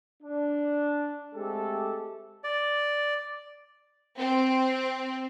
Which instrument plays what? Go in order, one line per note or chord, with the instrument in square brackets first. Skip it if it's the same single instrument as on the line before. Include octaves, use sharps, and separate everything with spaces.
[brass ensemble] D4
G#3 A3 C4 G4 A4
[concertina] D5
[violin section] C4